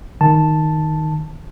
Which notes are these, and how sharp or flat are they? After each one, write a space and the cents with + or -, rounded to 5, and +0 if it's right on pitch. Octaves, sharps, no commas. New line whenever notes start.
D#3 +0 A5 +0